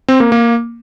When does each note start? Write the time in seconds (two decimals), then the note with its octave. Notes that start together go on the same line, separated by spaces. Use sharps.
0.08 C4
0.20 A#3
0.32 A#3